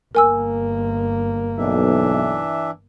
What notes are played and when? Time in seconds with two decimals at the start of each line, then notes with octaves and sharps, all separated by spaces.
0.15 G1 A#3 A#4 G#5 E6
1.58 B1 E3 D4 E5